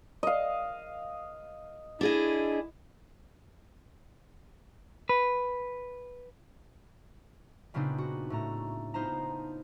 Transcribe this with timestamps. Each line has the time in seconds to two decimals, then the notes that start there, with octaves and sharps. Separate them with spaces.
0.23 D#5 F5
2.01 D4 E4 G#4 D#5
5.09 B4
7.74 A#2 C#3 B3 C4 D4 D#4
7.98 F#4
8.30 A2 A3 A#5
8.94 B3 D#4 F4 C5 A5 A#5